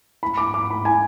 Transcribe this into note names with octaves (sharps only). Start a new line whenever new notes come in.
B5
D6
D6
B5
G#5